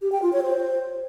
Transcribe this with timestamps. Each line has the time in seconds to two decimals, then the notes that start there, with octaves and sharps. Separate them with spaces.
0.02 G4
0.12 G5
0.22 F4
0.33 C#5
0.43 C5